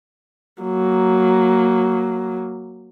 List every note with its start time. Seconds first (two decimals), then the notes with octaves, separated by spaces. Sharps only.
0.63 F#3 A#3